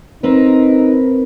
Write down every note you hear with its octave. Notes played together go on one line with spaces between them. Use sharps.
C4 D#4 A#4 B4